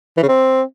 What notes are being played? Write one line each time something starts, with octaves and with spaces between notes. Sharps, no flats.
E3
C#3
C4